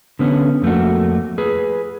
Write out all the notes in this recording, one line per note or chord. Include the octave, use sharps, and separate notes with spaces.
D3 B3 C#4
F2 A3 A#3 F#4
G#4 B4